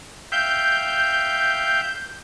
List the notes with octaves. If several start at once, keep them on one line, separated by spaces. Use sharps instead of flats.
E5 F5 G5 G6